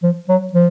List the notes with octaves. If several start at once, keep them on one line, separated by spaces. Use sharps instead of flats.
F3
F#3
F3